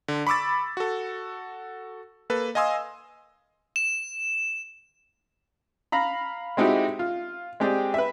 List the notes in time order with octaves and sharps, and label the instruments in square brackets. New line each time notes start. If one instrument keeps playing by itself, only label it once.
[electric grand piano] D3
B5 C#6 D6 E6 A6
F#4 A4
A#3 A4 B4
D#5 F5 G#5 C6 D#6 E6
[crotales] E7
[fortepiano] F5 A#5 B5
G#3 C4 D#4 E4 F#4 G4
F4
G#3 C4 G4 G#4 D5
B4 E5